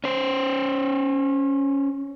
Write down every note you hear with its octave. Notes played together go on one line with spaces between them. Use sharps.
C#4 C5